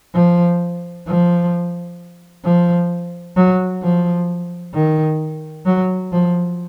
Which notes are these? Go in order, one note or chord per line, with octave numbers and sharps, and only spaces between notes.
F3
F3
F3
F#3
F3
D#3
F#3
F3